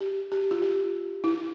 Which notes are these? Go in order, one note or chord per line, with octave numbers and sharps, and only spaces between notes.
G4
G4
F4
G4
E4